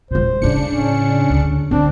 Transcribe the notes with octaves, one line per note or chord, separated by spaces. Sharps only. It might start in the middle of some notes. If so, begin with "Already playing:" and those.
E1 A#2 C5
A2 C#3 D4 E4 C#7
C#4
D2
D2 C4 D4